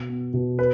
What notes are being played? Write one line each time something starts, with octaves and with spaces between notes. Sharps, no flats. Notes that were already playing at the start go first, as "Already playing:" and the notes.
Already playing: B2
B3
B2
B4